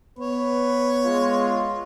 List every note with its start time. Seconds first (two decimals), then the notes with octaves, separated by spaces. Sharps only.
0.19 B3 B4 C#5
1.05 G#3 F4